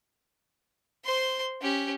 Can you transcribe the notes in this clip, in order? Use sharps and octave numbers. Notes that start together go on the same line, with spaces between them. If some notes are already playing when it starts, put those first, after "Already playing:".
C5 C6
C#4 G4